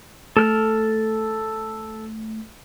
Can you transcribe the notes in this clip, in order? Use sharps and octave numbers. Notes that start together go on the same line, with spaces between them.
A3 A4 F6